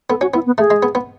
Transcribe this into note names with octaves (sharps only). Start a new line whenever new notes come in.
B3 A4
C#4 F#4
B3 E4
B3
A3 G#4
G#3
B3
B3